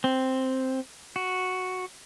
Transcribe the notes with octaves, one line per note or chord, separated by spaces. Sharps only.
C4
F#4